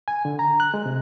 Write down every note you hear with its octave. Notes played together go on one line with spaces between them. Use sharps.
G#5
D3
A#5
F#6
G#3
C3